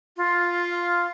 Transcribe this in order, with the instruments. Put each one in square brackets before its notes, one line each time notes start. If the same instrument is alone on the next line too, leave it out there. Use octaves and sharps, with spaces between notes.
[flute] F4